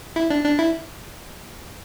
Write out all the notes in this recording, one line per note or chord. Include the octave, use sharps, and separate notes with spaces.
E4
D4
D4
E4